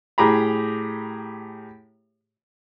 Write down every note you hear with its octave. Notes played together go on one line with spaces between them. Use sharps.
A2 G4 G#4 A#5 B5